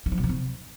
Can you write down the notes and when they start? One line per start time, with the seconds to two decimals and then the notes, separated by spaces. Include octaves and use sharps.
0.06 D#3
0.12 F3
0.18 B2
0.23 F3
0.29 C3